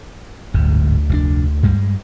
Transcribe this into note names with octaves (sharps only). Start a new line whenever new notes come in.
D1 G1 D2 G#2
F1 B2 D4
G2 G3 G#3